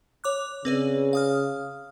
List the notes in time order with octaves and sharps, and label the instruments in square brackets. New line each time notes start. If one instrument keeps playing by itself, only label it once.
[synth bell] C#5 D6 F#6
[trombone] C#3 [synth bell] C4 B4 D5
[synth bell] F5 D#6 F6